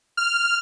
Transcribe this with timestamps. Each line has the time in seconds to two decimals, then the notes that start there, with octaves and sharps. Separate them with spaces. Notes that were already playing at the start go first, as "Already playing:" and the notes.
0.17 F6